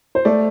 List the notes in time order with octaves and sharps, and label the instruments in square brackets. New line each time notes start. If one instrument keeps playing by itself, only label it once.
[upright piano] C5
A3 D5